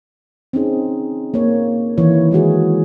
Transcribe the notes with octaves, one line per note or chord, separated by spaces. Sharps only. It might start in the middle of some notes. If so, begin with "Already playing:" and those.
C4 C#4 D#4 G#4
A#3 C#5
D#3 E3 E4 C#5
G#3 E4 F#4 G#4